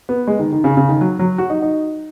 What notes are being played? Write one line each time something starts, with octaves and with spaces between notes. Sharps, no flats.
B3
G#3
D#3
D#3
C#3
C#3
D#3
F#3
F#3
F#4
D#4
D#4